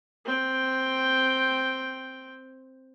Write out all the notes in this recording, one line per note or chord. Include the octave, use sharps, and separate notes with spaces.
C4 G5